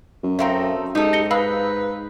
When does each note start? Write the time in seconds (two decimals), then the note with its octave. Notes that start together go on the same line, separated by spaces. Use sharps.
0.23 F#2
0.39 A3 C4 D#4 E5 F5 G5
0.95 G#2 D#4 G4 A4
1.13 A#6 C#7 G7
1.31 D#4 B4 F5 B5 E6